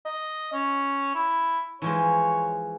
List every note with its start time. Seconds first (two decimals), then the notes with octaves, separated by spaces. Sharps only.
0.05 D#5
0.53 C#4
1.15 E4
1.82 E3 F3 G#3 C#5